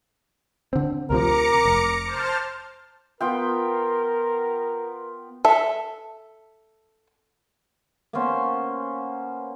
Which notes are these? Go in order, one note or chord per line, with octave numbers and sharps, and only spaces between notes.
D3 C4
D2 C3 F3 A#4 A#5 D6 C#7
F1
C5 A5 F6
B3 F4 A#4 G5
A4 E5
A#3 B3 C#4 C5